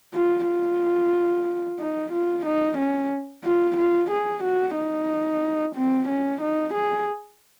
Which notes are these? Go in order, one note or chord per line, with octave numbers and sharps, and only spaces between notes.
F4
F4
D#4
F4
D#4
C#4
F4
F4
G#4
F#4
D#4
C4
C#4
D#4
G#4